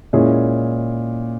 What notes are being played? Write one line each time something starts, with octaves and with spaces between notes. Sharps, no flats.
A#2 G#3 C#4 E4 G#4